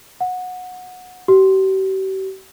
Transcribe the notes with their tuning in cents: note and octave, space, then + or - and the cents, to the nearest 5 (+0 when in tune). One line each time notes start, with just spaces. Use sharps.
F#5 -20
G4 -45